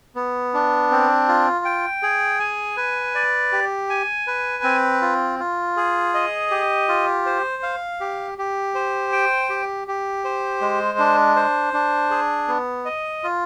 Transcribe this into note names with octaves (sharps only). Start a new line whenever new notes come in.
B3
D4
C4
F4
G5
G#4
G#5
B4
D5
G4
G#5
B4
C4
F4
F4
G#4
D#5
G4
F4
C5
F5
G4
G4
C5
G5
G4
G4
C5
G#3
D4
C5
D4
G#4
B3
D#5
F4